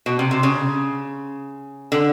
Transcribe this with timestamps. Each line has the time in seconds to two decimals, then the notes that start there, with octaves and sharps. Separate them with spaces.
0.06 B2
0.19 C3
0.31 C3
0.43 C#3
1.92 D3